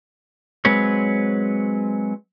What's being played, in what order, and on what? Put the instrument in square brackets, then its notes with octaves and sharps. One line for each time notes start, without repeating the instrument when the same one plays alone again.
[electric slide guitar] F#3 G#3 C4 B4 C#5